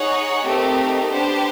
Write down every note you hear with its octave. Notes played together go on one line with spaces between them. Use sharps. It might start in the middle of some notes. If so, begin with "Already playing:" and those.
Already playing: D#4 G#4 C#5 F#5
A3 C4 D#4 G4 A#4
B3 D4 G4 C5